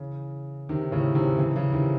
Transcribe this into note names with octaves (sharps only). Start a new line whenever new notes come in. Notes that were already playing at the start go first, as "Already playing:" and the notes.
Already playing: C#3 E3
C3 D#3
A2 C#3
C3 D#3
C#3 E3
C#3 E3
C3 D#3